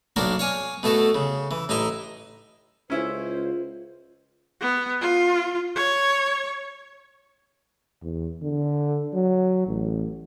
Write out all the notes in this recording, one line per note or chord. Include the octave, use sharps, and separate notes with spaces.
B1 A#3 D4 F#4 A#4
C#5 F5 G#5
B2 A3 F#4 A4
C#3
E3
A1 D#4 E4 A#5 C6
C#2 C#4 E4 F4 C5
B3
F4
C#5
E2
D3
F#3
A1